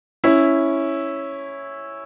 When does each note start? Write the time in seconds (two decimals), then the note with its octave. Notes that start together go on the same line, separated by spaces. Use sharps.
0.24 C#4 E4